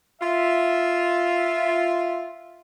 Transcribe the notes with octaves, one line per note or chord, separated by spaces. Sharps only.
F4 E5